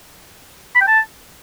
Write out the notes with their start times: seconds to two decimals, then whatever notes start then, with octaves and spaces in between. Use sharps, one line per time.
0.75 B5
0.81 G5
0.88 A5